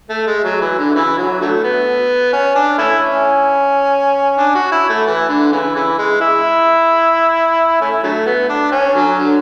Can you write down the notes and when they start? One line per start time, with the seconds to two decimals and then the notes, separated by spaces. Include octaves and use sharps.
0.10 A3
0.27 G#3
0.44 F#3
0.61 E3
0.78 D3
0.95 C#3 E3
1.18 F#3
1.41 D3 F#3 A3
1.64 B3
2.33 C#4
2.55 D4
2.78 A3 C#4 E4
3.01 C#4
4.38 D4
4.55 F#4
4.72 E4
4.89 A3
5.07 E3
5.29 D3
5.52 C#3 E3
5.75 C#3 E3
5.98 G#3
6.21 E4
7.81 A3 C#4 E4
8.03 D3 F#3 A3
8.26 B3
8.49 D4
8.72 C#4
8.95 D3 F#3
9.18 D3